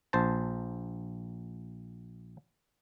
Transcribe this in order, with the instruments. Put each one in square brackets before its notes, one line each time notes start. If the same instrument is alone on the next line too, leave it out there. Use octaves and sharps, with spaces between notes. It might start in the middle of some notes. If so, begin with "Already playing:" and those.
[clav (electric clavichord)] A#1 C5 A5